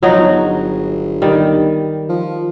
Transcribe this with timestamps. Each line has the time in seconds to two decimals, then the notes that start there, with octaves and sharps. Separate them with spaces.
0.03 F3 F#3 D#4 F#4
0.18 G1
1.22 D#3 G3
2.09 F3